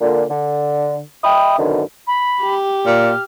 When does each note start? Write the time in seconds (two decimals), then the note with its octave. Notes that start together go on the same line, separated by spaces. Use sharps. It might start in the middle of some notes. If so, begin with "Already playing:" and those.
0.01 A#2 D3
0.30 D3
1.23 D#5 E5 G5 B5 D#6
1.58 F#2 B2 D3 D#3
2.07 B5
2.42 G4
2.86 A#2 F6